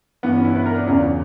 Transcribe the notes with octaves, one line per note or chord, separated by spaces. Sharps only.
G2 E3 B3
C#4
E4
B4
A#4
D4
E2 C#3 E3 C#4